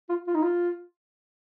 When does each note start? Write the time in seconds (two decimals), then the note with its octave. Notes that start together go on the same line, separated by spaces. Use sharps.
0.09 F4
0.27 F4
0.35 D#4
0.43 F4